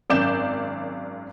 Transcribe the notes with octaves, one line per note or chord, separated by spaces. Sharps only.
G#1 F#2 C#4 D5 G6 E7